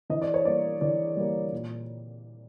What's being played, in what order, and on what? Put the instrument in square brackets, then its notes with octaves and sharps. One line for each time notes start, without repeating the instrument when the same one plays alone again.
[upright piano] E3 D#5
D5
C#5
G3 A#3 D5
E3 D5
G3 A#3
A#2